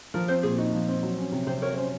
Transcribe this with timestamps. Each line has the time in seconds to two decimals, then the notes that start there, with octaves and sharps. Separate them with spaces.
0.14 F3 A#4
0.28 C4 C5
0.43 A#2 G#4
0.58 D#4 F#4
0.73 F3
0.88 C4
1.03 F#3
1.18 C#4
1.32 C3
1.47 C3 C5
1.62 F#3 A#4 C#5
1.72 C#5
1.77 C#4 C5